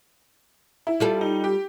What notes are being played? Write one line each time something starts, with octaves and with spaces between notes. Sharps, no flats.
E4
G3 F4 A4
D#4
G4